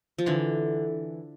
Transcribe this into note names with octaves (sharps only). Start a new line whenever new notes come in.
F3
D3 E3